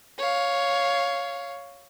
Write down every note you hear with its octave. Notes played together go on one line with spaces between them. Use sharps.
C#5 F5